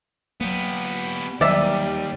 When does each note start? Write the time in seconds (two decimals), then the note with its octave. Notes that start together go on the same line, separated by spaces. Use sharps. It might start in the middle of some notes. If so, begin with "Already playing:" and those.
0.41 F#3 A#3 B3 G4
1.41 D#2 D#3 F#3 G3 D5 E5